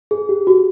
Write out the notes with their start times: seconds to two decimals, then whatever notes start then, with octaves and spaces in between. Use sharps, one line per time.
0.11 G#4
0.29 G4
0.47 F#4